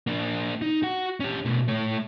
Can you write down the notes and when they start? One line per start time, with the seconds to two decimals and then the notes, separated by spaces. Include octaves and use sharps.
0.07 A#3 D4
0.62 D#4
0.83 F#4 F#5
1.20 C#4 G4
1.45 B2 A3
1.68 A3 C#5